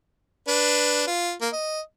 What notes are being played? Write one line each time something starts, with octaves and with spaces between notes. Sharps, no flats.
D4 B4
F4
A#3
D#5